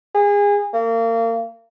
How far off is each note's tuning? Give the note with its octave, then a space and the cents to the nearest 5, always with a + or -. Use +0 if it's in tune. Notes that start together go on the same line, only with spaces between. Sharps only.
G#4 -30
A#3 -30